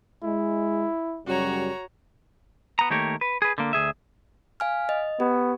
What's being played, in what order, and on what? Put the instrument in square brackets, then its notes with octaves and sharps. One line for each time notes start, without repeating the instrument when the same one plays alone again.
[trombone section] G#3 [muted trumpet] E4
[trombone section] F#2 C#3 G3 [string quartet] F#4 C#5 A#5
[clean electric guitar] B3 A#5
D#3 A3 A#3 G4 A#4 C#5
B4
G#4 B4
D3 A#3
D2 G#4 E5
[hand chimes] F5 G#5 F6
D#5
[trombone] B3 [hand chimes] G4